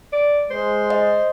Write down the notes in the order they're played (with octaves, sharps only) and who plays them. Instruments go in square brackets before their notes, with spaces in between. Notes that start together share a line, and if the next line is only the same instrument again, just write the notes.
[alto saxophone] D5
[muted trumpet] G#3 [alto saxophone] C5
[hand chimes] D#5